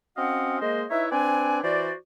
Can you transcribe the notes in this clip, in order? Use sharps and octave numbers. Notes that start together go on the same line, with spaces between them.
C4 C#4 F#4 D#5 F5 F#5
G#3 A#3 A#4 C5 D#5
D#4 E4 B4 C#5 E5
C4 D4 B4 D5 G#5
E3 F#4 C5 D5